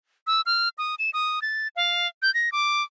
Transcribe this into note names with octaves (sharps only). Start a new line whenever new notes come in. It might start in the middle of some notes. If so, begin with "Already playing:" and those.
E6
F6
D#6
E7
D#6
A6
F5
G6
A#6
D6